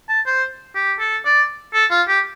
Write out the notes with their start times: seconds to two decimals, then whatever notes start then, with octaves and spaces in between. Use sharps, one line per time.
0.09 A5
0.26 C5
0.75 G4
1.00 A4
1.25 D5
1.74 A4
1.91 F4
2.08 G4